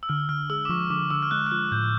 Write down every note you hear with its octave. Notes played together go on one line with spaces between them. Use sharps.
E6
D3 F6
D3 F6
G#3 E6
D6
F3 C#6
D3 D6
D3 E6
F6
G#3 F#6
F6
F3 F#6
A2 G6